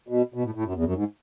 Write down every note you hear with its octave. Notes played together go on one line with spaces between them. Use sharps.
B2
B2
A2
A2
F#2
E2
F#2
G#2